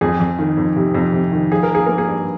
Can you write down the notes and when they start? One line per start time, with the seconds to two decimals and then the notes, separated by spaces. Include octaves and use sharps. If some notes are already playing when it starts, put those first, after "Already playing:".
0.01 F2 G#4
0.20 F2
0.39 D#3
0.57 F2
0.76 C3
0.95 F2
1.13 C3
1.32 D#3
1.51 F3 G#4
1.63 A#4
1.70 F3 G#4
1.86 A#3 A#4
1.98 G#4
2.08 G2